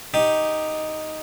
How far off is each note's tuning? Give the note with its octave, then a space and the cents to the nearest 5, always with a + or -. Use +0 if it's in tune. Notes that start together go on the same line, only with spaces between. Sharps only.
D#4 +0 G4 +0